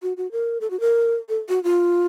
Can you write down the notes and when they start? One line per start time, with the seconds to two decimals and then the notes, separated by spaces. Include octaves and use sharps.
0.03 F#4
0.17 F#4
0.32 A#4
0.61 A4
0.71 F#4
0.80 A#4
1.29 A4
1.49 F#4
1.64 F4